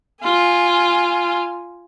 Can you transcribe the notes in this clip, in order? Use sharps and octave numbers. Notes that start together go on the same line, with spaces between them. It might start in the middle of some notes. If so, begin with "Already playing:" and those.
F4 G#5